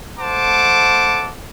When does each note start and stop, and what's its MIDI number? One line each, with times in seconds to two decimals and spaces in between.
0.19 1.32 57
0.19 1.32 72
0.19 1.32 78
0.19 1.32 81
0.19 1.32 86